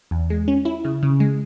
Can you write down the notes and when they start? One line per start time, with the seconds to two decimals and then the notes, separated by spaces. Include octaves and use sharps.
0.11 E2
0.30 G#3
0.48 C#4
0.65 E4
0.85 C#3
1.03 C#3
1.20 G#3